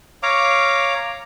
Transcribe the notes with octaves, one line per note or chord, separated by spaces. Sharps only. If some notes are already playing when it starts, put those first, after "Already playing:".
C#5 F5 A#5 D6